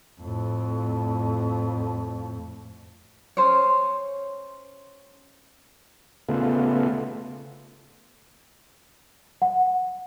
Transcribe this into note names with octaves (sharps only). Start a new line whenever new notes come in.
F2 A2
C#4 C5 C#5
C#3 A3 B3 F4
F#5